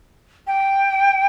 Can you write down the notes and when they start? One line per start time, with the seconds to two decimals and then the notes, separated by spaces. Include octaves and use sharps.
0.47 G5